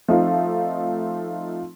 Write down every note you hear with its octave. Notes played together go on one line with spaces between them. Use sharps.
F3 A3 C4 D#4 F4 A4